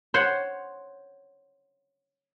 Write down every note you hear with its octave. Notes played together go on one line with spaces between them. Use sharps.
C5 C#5 F#5